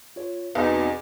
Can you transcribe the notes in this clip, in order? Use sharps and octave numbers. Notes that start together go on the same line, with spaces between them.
F4 C#5
E2 B2 C4 D#4 B4 D#5 G#5